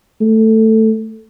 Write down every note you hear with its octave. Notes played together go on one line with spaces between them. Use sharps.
A3